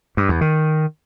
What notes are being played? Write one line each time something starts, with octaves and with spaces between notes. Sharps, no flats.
G2
E2
D#3